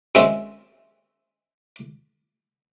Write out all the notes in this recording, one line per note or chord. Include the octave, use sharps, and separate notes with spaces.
F#2 G#3 C4 E5